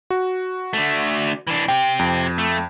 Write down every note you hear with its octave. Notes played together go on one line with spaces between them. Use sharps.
F#4
D3 A3
E3 D4
C4 G4 G5
F2
A3